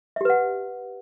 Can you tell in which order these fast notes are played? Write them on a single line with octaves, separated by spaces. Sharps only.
E5 G4 B4 F#5